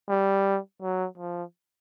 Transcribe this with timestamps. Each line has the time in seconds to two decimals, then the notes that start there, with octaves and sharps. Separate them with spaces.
0.09 G3
0.82 F#3
1.18 F3